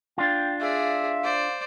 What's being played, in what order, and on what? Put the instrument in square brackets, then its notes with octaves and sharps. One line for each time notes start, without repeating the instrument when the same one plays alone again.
[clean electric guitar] D4 F4 [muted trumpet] G5
[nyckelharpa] G#4 D5 [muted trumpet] E5 [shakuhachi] F5
[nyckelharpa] C5 D5